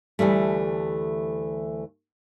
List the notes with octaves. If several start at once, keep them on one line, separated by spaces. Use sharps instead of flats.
D2 E3 G3 A3